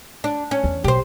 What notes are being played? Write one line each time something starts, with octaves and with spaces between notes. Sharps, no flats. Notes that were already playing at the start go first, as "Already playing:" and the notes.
D4
C#4
E2
B1 G4 C5